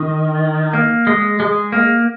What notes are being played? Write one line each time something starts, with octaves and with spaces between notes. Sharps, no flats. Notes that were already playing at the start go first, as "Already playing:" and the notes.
Already playing: D#3
A#3
G#3
G#3
A#3